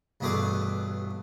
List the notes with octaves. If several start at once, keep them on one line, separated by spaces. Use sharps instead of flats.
A1 G2 B2 A3 G#4 D6